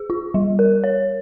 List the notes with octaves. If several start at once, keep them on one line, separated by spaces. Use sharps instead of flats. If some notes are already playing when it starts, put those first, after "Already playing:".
Already playing: G#4
F4
G3
A#4
C#5